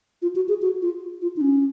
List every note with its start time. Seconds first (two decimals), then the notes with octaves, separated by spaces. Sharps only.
0.22 F4
0.36 F#4
0.49 G#4
0.62 F#4
0.82 F4
1.22 F4
1.37 D#4
1.41 C#4